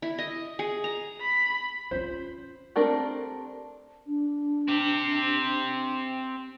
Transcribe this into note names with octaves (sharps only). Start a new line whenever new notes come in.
E4
D#5
G#4
A#5
B5
C#4 F4 C5
A3 C4 D4 G4 A#4
D4
C4 G4